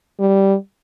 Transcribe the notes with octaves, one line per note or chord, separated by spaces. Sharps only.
G3